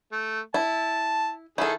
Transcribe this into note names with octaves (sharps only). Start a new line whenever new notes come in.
A3
E4 A5
D#3 E4 G#4 A4